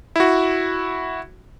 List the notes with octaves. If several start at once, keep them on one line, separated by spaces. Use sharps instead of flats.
E4 F#4